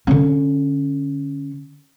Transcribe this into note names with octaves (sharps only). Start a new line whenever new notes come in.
D3 C#4